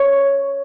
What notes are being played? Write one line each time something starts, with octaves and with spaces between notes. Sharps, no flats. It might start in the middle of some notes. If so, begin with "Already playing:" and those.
Already playing: C#5